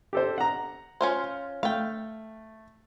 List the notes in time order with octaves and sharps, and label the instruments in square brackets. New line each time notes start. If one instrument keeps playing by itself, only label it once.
[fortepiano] G4 A4 C5
F#5 A#5
[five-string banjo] C#4 F4 C5
[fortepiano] A3 [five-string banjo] F5 G5